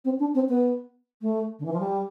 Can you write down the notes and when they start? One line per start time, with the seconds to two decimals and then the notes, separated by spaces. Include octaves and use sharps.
0.04 C4
0.19 D4
0.34 C4
0.48 B3
1.21 A3
1.59 D3
1.65 E3
1.73 F3
1.79 G3